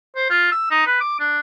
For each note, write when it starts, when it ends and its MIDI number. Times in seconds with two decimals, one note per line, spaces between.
0.16 0.29 72
0.30 0.50 65
0.52 0.66 88
0.71 0.85 63
0.87 0.97 71
1.00 1.18 86
1.20 1.39 62